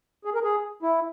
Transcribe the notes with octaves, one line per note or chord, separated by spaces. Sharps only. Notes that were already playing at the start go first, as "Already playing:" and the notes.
G#4
A#4
G#4
E4